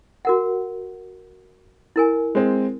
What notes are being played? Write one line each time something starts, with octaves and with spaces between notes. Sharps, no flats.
F#4 A#4 F#5
E4 A#4 G#5
G#3 C4